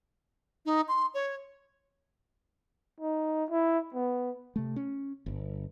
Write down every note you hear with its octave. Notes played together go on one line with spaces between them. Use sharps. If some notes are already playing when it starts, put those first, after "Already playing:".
D#4
C6
C#5
D#4
E4
B3
C3 A3
C#4
G1